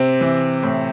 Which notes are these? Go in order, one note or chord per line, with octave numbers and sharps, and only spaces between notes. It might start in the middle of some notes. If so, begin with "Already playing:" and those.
Already playing: C3 C4
E3
A2